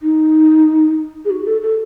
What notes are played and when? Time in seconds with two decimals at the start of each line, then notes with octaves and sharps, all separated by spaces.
0.02 D#4
1.25 G#4
1.30 F#4
1.46 A4
1.62 A4